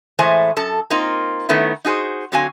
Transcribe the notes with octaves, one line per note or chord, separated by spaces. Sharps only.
A2 E3 G#3 A3 C5 G#5
F#2 A4 A5
A#3 C4 D#4 F4
D#3 A3 B3 C#4 E4
D#4 F#4 G#4 C5
D3 F#3 C4 F#4 F5 G#5